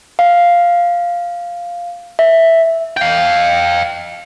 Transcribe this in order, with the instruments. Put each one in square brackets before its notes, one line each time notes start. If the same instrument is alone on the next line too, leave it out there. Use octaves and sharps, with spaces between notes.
[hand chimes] F5
E5
[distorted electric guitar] F5 G5